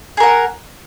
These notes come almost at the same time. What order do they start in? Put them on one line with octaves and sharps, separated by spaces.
G#4 A#4 F#5